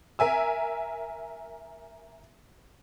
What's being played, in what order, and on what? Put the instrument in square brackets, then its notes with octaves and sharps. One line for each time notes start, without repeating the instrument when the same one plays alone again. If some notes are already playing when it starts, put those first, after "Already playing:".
[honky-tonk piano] A#4 E5 G#5 E6